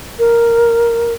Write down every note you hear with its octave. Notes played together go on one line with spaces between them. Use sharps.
A#4